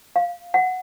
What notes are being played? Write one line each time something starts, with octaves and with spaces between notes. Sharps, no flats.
F5
F#5